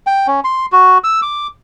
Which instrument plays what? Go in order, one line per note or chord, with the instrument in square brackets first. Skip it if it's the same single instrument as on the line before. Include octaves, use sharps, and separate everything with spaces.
[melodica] G5
C#4
C6
F#4
E6
D6